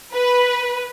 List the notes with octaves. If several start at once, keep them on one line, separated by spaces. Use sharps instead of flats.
B4